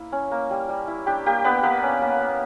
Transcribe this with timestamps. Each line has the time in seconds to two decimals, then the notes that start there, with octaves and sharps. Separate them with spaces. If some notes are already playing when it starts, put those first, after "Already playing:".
Already playing: A#3 E4
0.12 C#4
0.31 A#3
0.51 G3
0.69 G3
0.88 E4
1.06 D4 G4
1.26 A#3 G4
1.44 B3 D4 B4
1.63 A#3 B3 B4
1.83 C#4
2.02 A#3
2.20 A#3